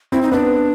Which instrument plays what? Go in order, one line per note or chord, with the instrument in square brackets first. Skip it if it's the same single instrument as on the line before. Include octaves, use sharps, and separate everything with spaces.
[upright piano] C4 [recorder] E4
[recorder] D#4
[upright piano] B3 [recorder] D4